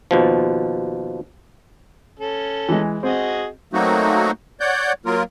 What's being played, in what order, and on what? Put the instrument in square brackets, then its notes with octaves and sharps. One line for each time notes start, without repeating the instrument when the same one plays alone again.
[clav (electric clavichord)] D#2 B2 F3
[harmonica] C#4 A4
[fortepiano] E3 G#3
[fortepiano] C4 [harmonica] F#4 G#4 D#5
[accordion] F#3 A3 A#3 C4 D#4 F#4
C#5 D5 F#5 G6
F#3 A#3 F4 A#4